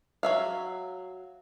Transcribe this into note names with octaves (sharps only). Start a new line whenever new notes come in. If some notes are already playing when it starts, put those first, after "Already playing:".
F#3 E5 F5